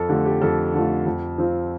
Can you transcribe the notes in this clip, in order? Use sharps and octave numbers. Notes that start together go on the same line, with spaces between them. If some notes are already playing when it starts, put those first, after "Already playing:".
Already playing: F2 A4
D3 A3 F4 G4
G4
F2 A4
D3 A3 F4
F2
F3 C4 F4